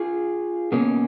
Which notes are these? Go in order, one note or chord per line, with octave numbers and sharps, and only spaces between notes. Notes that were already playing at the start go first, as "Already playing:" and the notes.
Already playing: F4 G#4
B2 A#3 C#4